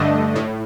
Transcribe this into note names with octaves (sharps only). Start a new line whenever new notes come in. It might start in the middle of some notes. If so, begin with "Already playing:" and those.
Already playing: G2 D3 A3 D4 D#5
A2